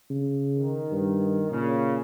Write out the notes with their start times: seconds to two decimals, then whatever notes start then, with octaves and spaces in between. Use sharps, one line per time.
0.10 C#3
0.56 D#3
0.91 G2
1.51 A#2 C#3